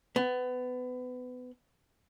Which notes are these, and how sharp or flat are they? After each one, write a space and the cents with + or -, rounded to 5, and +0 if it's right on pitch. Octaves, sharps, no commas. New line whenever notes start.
B3 +25